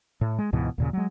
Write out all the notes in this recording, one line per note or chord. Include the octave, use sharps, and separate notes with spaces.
A2
G#3
C#2 G#2 B2 E3
D#2 A#2 C#3
F#3 G#3